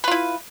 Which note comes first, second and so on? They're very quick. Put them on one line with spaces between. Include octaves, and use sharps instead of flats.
B4 F4 E4